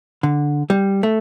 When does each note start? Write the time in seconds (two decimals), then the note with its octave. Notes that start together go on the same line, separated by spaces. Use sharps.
0.23 D3
0.70 G3
1.03 A3